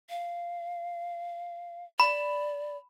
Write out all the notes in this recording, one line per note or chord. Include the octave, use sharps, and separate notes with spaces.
F5
D5 B5